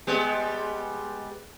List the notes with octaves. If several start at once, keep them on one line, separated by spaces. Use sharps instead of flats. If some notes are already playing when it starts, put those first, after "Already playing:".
G3 G#3 B3